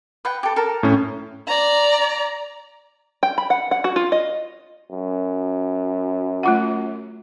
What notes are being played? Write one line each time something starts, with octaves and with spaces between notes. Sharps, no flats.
B4 F#5 G5
G4 A4
A4 A#4 A#5
A2 C#4
D5 A#5
G5
B5
F#5
F#5
F#4
F4
D#5
F#2
A3 F4 F#5